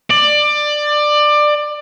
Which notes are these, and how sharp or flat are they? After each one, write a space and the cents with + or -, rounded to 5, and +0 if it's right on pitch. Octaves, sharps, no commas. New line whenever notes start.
D5 +20